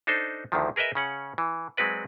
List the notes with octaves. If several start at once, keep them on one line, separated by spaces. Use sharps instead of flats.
D4 D#4 A4 C5
D2 D3 D#3 F3
G#4 A#4 B4 D#5 E5
C#3 C#4 F#5
E3
F#3 G#3 C4 F#4 B4 D5